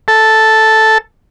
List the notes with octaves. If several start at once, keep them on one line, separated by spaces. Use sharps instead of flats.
A4